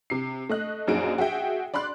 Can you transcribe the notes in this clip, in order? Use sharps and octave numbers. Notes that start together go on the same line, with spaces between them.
C3 C7
A3 D#5 F#6
A#1 F#2 D#4 G#4 D7
F#4 G#4 E5 G5
D5 B5 C6 F#6